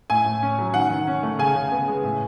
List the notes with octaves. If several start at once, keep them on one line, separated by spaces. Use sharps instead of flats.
A2 G#5
A2
C#4
F#3
D#3 F#5
D#3
C#4
A3
C#3 G#5
C#3
B3
G#3
A2